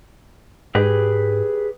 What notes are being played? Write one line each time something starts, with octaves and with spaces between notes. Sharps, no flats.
G#2 G4 G#4 B4